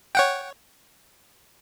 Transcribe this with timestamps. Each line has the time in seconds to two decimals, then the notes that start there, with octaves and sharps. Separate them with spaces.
0.15 C#5 F#5 G5